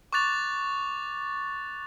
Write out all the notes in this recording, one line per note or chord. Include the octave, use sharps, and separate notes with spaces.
C#6 D6 F#6 A6 F7